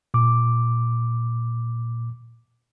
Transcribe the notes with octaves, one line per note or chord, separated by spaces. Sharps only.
A#2 D6